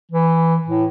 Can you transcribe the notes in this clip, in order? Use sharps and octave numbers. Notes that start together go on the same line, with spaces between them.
E3
A2